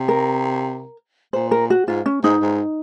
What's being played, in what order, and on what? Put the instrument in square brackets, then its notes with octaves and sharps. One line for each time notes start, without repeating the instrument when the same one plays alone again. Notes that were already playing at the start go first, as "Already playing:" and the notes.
Already playing: [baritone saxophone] C3
[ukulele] A#4
[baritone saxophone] A#2 [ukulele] C5
[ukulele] A#4
F#4
[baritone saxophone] G#2 [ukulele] F4
[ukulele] C#4
[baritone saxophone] G#2 [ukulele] D#4
[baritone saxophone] G#2